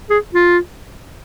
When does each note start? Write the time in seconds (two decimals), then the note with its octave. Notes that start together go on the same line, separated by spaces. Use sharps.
0.10 G#4
0.35 F4